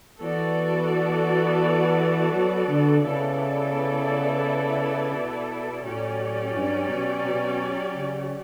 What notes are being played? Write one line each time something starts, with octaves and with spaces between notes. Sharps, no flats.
E3 B3 F#4 A4 D5
F#3
D3
C#3 B3 E4 A4 D5
B2
A2 F#3 C#4 G4 D5
G2
B2
B2
C#3